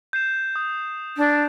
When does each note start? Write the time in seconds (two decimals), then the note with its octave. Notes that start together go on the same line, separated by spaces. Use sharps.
0.13 G6 C7 E7
0.56 D#6
1.17 D4